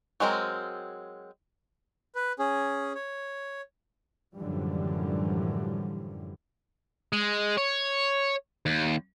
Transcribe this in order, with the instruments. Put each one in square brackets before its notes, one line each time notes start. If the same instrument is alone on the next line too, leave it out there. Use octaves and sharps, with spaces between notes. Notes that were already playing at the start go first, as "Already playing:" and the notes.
[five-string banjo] F#3 G#3 C4 A#4
[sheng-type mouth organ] B4
C#4 G#4
C#5
[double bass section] F#2 A2 D3 E3 F3 G3
[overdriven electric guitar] G#3
C#5
D#2